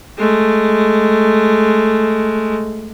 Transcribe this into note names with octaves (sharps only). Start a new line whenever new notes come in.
G#3 A3